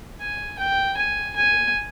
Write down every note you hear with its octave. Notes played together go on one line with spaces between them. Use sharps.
G#5
G5
G#5
G#5